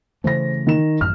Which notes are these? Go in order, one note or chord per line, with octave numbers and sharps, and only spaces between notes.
C#3 E3 A3 C5 A#6
D#3 E7
A1 F#2 F6